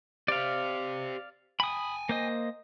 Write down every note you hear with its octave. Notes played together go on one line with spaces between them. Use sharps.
G4 C5 D5 F5
G5 G#5 B5 D#6
A#3 C5 D#5